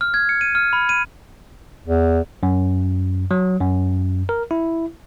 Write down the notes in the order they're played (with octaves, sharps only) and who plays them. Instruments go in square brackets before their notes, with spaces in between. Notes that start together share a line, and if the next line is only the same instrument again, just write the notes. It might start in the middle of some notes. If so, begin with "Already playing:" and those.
[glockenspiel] F6
G#6
C#7
D#7
F6
B5
D#7
[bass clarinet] E2
[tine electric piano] F#2
F#3
F#2
A#4
E4